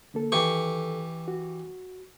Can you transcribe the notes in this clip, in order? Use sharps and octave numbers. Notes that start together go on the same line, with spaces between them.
D3 A#3 A4
D#3 E3 G4 A4 C#6
F#4